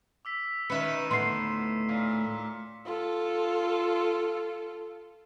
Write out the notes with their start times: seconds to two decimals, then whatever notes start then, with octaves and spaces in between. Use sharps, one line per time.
0.25 D6 E6 B6
0.70 D#3 C#4 B4 E5 C#7 E7
1.11 D2 A2 B3 C6 C7
1.89 A#2
2.85 F4 A4